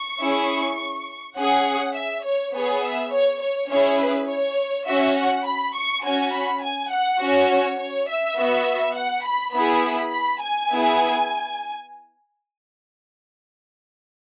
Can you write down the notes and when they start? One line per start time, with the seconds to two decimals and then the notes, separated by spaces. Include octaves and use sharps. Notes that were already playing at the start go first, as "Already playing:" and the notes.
Already playing: C#6
0.20 C#4 E4 G#4
1.37 C#4 G#4 F#5
1.95 E5
2.24 C#5
2.54 B3 G#4 C#5
2.83 E5
3.11 C#5
3.41 C#5
3.70 C#4 E4 G#4 C#5
3.99 B4
4.28 C#5
4.86 C#4 F#4 E5
5.16 F#5
5.46 B5
5.75 C#6
6.03 C#4 F#4 G#5
6.33 B5
6.62 G#5
6.91 F#5
7.20 C#4 F#4
7.49 C#5
7.78 C#5
8.09 E5
8.37 B3 F#4
8.95 F#5
9.25 B5
9.54 B3 E4 G#4 B5
10.12 B5
10.41 G#5
10.70 B3 E4 G#4